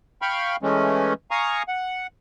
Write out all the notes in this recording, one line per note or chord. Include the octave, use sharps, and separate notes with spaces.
F5 G5 B5 C#6 F6
E3 G#3 A3 C#4
F5 G#5 A#5 C#6 D#6
F#5